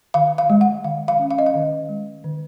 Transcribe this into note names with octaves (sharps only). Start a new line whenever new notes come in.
D#3 F5
F5
G#3
F#5
D#3 F5
F5
C#4
F5
D#5
F5
D#3
G#3
D#3